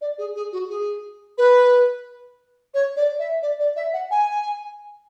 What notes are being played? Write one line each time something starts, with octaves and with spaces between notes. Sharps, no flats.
D5
G#4
G#4
F#4
G#4
B4
C#5
D5
E5
D5
D5
E5
F#5
G#5